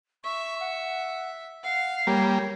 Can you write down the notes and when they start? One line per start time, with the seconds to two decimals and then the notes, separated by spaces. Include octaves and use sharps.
0.24 E5 C#6
0.61 F#5
1.63 F5 F#5
2.07 G3 A#3 C#5